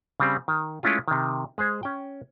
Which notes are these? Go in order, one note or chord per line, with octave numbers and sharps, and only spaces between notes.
C#3 G3 C4
D#3
G#3 A3 C#4 E4 F4
C3 D#3
G#3 G#4 C5
C#4 G5